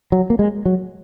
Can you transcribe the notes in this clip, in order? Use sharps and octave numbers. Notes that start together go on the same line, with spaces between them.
F#3
A#3
G#3
F#3